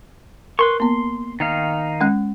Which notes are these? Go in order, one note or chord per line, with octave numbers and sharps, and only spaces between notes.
A#4 B4 C6 C#6
A#3 B3 C6
D#3 D#4 F5
G#3 C#4 F#6